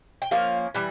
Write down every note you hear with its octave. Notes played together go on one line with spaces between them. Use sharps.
G5
F3 A#3 C#4 F5
E3 G3